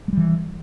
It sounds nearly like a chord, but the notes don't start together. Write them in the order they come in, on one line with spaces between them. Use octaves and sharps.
G#3 G3 E3